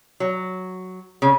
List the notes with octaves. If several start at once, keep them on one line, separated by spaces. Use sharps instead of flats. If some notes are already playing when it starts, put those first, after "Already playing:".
F#3
C#3